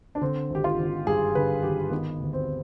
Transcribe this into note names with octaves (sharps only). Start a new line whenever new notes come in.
D4
D3 C4
G#1 G4
F4
G#1
G2 G#4
D3 B4
G#1 G4
D#3 B3
D2
C4